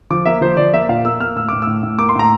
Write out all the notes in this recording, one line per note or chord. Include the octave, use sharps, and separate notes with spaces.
F3 D6
A#3 E5
F3 C5
F3 D5
A#3 E5
A#2 F5
A#3 E6
A#3 F6
A2 E6
A2 D6
A2 E6
A2
A#3 D6
C6
A2 A#5